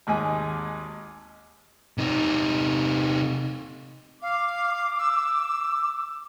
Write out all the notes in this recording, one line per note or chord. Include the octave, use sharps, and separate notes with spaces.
G#1 D#2 G#3 G#5
C3 D#4
F5 D6
E6